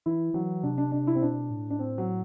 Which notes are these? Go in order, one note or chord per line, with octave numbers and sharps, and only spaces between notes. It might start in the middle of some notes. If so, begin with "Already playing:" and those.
E3 E4
E3 F#3
C3 D4
D4
D4
E4
C4
B2 D4
A2
D4
C4
F#3